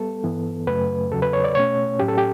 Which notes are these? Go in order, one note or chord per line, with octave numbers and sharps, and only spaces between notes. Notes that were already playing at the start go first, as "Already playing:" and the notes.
Already playing: G3 B3 A4
G2 E3 B3
F#2 C#3 F#3 A3 B4
E2 C#3 F#3 A4
B4
C#5
D5
B2 A3 C#4 C#5
A2 F#3 C#4 G4
A4
G4